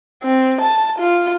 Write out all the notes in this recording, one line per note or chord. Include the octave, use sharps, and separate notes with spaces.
C4
A5
F4